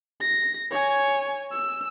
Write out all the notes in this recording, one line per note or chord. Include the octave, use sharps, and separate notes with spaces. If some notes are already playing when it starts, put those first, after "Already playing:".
A#6
C#5 G#5
E6